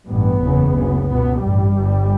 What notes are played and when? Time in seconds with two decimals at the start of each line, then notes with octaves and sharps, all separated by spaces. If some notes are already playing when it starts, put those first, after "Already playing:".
0.08 A1 G2 B3
0.42 F#1 E2 C#3
0.76 D2 C#3
1.09 C#2 B2 B3
1.42 A1 G2 G3
1.77 G1 G2